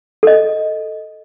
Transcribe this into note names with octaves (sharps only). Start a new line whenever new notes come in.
A4 D#5